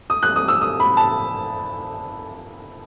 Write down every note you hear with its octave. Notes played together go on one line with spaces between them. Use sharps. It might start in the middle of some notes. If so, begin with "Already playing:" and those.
D#6
F#6
D#6
E6
D#6
B5
A5